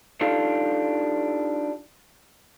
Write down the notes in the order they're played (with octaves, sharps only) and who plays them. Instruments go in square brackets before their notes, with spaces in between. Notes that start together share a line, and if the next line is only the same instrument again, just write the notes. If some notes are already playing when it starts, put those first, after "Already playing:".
[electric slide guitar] D4 D#4 F4 G4 A4 F5